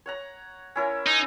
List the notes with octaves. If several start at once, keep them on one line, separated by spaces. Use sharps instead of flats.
C#5 F#5 A#5
C#4 E4 A#4
D#4